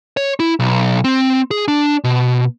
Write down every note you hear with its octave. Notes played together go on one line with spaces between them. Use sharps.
C#5
E4
B1
C4
G#4
D4
B2